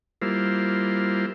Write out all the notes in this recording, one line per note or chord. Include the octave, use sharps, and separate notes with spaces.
G3 A#3 E4 F4 C5